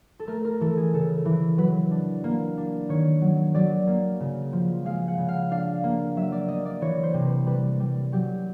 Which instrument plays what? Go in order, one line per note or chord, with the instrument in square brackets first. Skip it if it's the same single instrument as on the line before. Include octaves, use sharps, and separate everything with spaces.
[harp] A4
A3 A#4
A#4
E3 A4
G#4
C#3 A4
E3
F#3 B4
D4
A#3
D4
D#3 C#5
F#3
F#3 D5
A#3
C#3
F3
G#3 F5
F#5
C#3
F5
D4 F5
A#3
F#3 E5
D5
A#3 D#5
D5
E3 C#5
C5
C3
B4
G3 B4
G3
F#3 G4